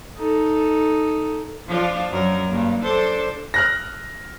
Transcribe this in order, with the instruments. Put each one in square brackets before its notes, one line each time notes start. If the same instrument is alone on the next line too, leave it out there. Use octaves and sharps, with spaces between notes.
[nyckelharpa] D#4 A4
[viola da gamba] F3 D4 F4
F#2 A#4
G2 A#3
D4 A4 C5
[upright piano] F6 F#6 A#6